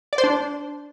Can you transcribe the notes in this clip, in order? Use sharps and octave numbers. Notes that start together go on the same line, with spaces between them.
D5
C5
D4